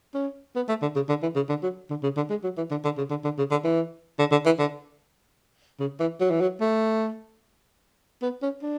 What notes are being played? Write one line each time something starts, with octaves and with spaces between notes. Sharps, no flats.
C#4
B3
A3
D3
C#3
D3
E3
C#3
D3
F#3
D3
C#3
D3
G#3
F#3
E3
D3
D3
C#3
D3
D3
C#3
D3
E3
D3
D3
E3
D3
C#3
E3
F#3
E3
F#3
A3
B3
C#4
D4